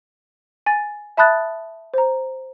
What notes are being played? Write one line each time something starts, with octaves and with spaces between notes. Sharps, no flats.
G#5 A6
E5 A5 B5 D#6 F#6 A6
C5 A#5